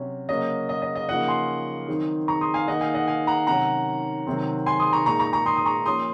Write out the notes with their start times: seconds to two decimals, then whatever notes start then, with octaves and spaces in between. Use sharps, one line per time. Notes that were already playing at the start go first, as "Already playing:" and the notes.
Already playing: C3 F#3 C#4
0.29 C#3 F#3 A#3 C#4 D#5
0.69 D#5
0.82 D#5
0.95 D#5
1.08 C#3 F3 A#3 D#4 D#5 F#5
1.28 G#5 C6
1.88 D#3 F#3 C4 D#4
2.28 A#5 C#6
2.41 C6 D#6
2.54 F5 G#5
2.68 D#3 A#3 D#4 D#5 F#5
2.81 F5 G#5
2.94 D#5 F#5
3.07 F5 G#5
3.27 F#5 A#5
3.47 C3 D#3 F#3 C#4 F#5 A#5
4.27 C3 D#3 F#3 C4
4.66 G#5 C6
4.80 C6 D#6
4.93 A#5 C#6
5.06 A#2 G#3 D#4 A#5 C#6
5.19 A#5 C#6
5.33 A#5 C#6
5.46 C6 D#6
5.56 D#6
5.66 A#5 C#6
5.86 F3 A#3 C#4 C6 D#6